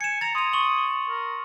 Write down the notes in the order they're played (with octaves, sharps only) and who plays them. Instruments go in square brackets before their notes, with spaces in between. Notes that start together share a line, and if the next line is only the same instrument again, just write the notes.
[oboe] G#5 [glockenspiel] C#7 E7
[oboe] A#5 [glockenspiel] A6 F7
[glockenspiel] C6 F7 [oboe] D#6
[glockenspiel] C#6 F#7
[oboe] A#4